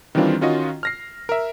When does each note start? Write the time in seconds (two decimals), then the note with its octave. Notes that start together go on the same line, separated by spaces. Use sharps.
0.15 D#3 E3 G3 C4 D4 F4
0.41 D#3 C#4 F4 F#4 D#5
0.83 F6 A#6 C7
1.29 A#4 E5